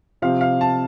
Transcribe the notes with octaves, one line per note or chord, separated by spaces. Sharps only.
C3 F3 C4 F5
F5
A5